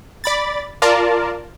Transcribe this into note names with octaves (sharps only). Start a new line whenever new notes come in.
D5 B5 A6
F4 A#4 D5 A5